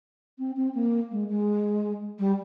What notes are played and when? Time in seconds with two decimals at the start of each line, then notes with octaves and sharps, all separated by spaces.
0.39 C4
0.56 C4
0.75 A#3
1.11 G#3
1.29 G#3
2.19 G3